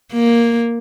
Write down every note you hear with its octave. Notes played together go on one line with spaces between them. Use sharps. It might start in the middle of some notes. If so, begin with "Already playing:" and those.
A#3